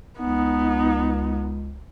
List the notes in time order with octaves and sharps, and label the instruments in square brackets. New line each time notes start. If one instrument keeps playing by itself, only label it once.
[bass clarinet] C#2 [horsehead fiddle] B3 D#4